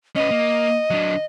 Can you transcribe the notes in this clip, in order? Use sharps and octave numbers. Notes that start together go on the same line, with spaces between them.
C#4 B4 D#5
A#3
F#3 D4